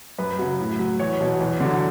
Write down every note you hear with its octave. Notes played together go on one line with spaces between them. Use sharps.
F#2 B4
C#3 F#3
A2
F#3
E2 C#5
B2 F#3
E2
D3 F#3